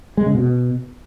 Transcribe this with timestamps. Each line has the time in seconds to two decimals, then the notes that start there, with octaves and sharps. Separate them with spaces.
0.17 G#3
0.26 C#3
0.35 B2